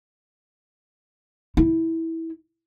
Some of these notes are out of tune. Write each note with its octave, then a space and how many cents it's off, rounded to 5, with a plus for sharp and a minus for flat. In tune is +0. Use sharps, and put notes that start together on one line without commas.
E4 -15